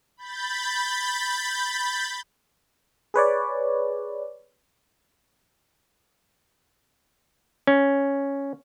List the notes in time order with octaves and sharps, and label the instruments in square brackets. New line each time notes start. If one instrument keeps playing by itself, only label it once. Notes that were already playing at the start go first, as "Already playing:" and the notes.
[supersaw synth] B5 G6 A6
[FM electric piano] G#4 B4 C#5 D5
[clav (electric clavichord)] C#4